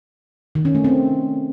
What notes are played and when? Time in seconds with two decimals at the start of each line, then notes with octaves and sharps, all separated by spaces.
0.55 D#3
0.65 C#4
0.75 A3
0.84 C4